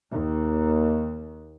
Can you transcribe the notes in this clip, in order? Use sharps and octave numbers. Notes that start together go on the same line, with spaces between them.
D#2